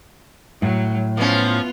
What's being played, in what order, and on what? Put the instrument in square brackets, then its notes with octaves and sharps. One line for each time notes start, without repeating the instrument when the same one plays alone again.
[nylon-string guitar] A2 [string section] F#3
[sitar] F3 C#4 [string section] B3 F4